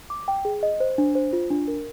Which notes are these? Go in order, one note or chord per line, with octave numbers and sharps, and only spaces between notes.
D6
G5
G#4
D#5
C5
D4
C5
F4
D4
A#4